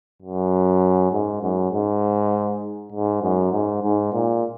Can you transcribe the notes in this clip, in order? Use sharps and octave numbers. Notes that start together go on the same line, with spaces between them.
F#2
G#2
F#2
G#2
G#2
F#2
G#2
G#2
A#2